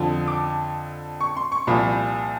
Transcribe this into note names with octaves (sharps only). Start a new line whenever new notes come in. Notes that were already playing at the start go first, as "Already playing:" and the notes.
Already playing: F2 D3 F3
D6
C#6
C6
C#6
C2 A#2 F3 B5